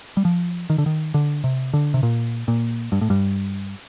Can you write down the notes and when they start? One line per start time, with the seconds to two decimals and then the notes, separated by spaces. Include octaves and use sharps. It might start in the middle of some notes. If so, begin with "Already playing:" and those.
0.17 G3
0.25 F3
0.70 D#3
0.78 D3
0.86 D#3
1.14 D3
1.44 C3
1.73 D3
1.94 C3
2.03 A#2
2.48 A#2
2.92 G2
3.01 A2
3.10 G2